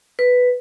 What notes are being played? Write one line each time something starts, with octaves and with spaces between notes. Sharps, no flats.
B4